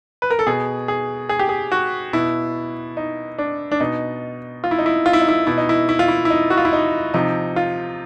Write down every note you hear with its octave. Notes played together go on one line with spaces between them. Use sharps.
B4
A#4
A4
B2 G#4
G#4
G#4
G4
G#4
F#4
B2 E4
D#4
D4
D4
B2 D#4
F4
E4
D#4
E4
F4
E4
D#4
E4
B2 E4
D#4
E4
E4
F4
E4
E4
D#4
F#4
F4
E4
D#4
C3 F3 D#4
F4